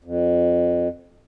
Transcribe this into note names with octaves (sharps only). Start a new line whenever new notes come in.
F2